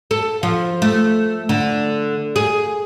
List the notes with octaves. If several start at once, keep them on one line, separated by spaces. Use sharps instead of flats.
A4
F3
A3
D3
G#4